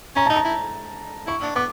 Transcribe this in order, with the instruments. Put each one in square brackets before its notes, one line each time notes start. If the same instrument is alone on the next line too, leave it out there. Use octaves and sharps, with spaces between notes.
[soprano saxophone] C#4 [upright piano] A#5
[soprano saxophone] D#4 [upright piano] A5
[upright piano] A#5
[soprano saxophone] E4
[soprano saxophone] E4 [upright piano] C#6
[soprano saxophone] D4
[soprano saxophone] B3 [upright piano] D6